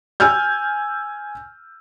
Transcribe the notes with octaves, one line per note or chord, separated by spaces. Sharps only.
G#5 E6 F6 G6